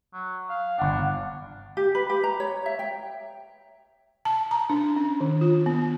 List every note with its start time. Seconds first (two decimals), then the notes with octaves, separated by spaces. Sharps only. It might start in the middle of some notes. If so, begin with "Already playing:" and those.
0.13 F#3
0.50 F5
0.78 G1 D4 F#5
1.77 G4
1.95 B4
2.10 G4
2.24 A#5
2.40 C#5
2.66 E5
2.79 G5
4.25 A5
4.51 A#5
4.70 D4
4.96 C#4
5.20 D#3
5.41 F4
5.66 B3